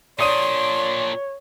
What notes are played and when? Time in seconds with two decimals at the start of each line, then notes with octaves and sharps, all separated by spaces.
0.19 A#2 D4 C#5 D5 C6 D#6 D#7